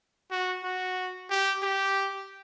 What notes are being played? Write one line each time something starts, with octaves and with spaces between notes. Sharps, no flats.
F#4
F#4
G4
G4